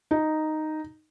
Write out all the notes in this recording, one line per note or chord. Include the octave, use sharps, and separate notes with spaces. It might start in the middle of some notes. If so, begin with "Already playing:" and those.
D#4